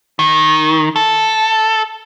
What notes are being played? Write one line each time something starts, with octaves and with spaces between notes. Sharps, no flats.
D#3
A4